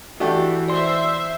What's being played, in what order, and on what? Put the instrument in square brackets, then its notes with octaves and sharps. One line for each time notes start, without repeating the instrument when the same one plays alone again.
[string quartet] E3 [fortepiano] A3 D4 G4 [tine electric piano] F#4
[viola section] C5 E5 [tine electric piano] D5 C6